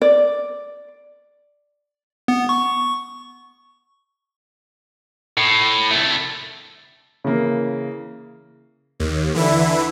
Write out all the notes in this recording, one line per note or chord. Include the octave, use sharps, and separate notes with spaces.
D5
B3
C#6
A2
C2 A3
C#3 E3 A#3
D#2
D3 E3 E4